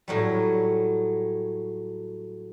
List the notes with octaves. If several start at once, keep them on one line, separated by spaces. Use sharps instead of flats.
A2 F#3 G3